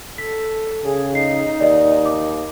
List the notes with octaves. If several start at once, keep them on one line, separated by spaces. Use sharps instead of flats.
A4 B6
C#3 G#4
D#4 C7
D#2 D5 D#5
D6